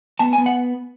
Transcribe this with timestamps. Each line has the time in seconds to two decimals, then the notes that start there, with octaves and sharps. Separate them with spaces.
0.19 B3 A5
0.33 G#5
0.38 B3
0.46 F#5